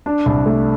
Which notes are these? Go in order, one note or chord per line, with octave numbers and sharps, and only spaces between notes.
D4
C2
A3